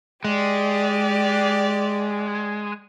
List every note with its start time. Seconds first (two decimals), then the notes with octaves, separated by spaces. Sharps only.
0.24 G#3 G4 D5